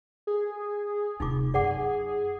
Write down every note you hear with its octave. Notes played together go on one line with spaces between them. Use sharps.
G#4
D1 C3 D#4 F4 D6
F#2 G#4 D5 F#5 D6